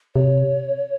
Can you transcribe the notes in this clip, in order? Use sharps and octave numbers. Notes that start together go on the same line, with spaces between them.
C3 C#5